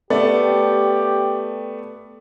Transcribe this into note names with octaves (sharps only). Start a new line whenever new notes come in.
A3 B3 G4 D5